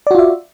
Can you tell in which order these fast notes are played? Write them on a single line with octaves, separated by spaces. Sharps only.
D5 F#4 F4 E5